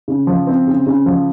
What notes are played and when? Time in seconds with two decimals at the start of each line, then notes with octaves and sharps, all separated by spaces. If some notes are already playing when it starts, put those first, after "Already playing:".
0.08 C#3
0.27 F3
0.47 C4
0.67 C#3
0.87 C#3
1.06 F3